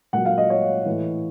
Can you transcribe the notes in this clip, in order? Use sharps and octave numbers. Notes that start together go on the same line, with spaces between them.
A#2 F#3 F#5
F5
D#5
C#5
A2 E3